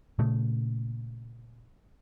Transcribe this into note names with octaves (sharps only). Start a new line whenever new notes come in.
A#2 C#3 A3